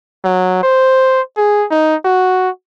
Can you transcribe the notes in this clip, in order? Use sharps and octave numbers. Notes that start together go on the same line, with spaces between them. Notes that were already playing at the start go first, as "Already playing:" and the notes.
F#3
C5
G#4
D#4
F#4